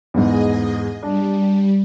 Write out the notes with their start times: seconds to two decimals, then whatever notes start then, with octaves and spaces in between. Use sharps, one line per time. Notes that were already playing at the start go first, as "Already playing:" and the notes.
0.14 E2 G#2 G#4 D#5
1.03 G3 D4